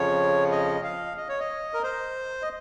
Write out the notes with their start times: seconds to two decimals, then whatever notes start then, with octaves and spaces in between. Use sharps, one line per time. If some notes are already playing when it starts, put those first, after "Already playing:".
Already playing: F2 C#3 F3 C#5
0.51 D#5
0.84 F5
1.17 D#5
1.29 C#5
1.40 D#5
1.74 A#4
1.84 C5
2.42 D#5